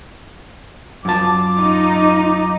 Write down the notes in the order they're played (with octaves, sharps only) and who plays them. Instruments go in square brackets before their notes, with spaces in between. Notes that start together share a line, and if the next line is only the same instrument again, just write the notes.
[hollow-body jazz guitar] F#2 A5 [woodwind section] F4 D6
[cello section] D#4